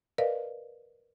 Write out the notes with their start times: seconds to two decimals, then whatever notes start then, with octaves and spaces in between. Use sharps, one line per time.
0.18 A#4 B4 D5 D#5 F5